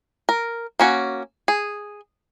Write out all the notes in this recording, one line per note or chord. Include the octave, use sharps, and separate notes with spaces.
A#4
A#3 C#4 F#4
G#4